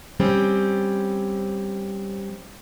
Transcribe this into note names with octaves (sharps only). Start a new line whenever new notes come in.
G3 C4 C#4